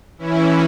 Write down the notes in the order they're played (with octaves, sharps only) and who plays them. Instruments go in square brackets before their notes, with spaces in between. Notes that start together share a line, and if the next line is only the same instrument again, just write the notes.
[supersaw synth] E3 C#4 E4